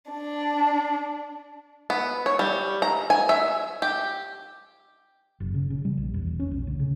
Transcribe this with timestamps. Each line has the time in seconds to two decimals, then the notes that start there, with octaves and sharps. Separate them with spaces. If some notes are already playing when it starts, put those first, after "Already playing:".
0.12 D4
1.90 B3
2.26 C#5
2.39 G3
2.82 A#5
3.10 G#5
3.29 E5
3.82 G4
5.40 F#1
5.54 C#3
5.70 C#3
5.85 G3
5.97 A#1
6.14 E2
6.27 E1
6.40 C#4
6.51 A#1
6.67 D2
6.79 C#3